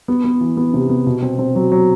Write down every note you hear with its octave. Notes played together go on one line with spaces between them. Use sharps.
B3
B3
E3
B3
C3
B3
B2
C4
C4
F#3
F#3